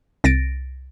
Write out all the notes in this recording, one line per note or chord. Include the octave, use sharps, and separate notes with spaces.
C2 A6 A#6 D7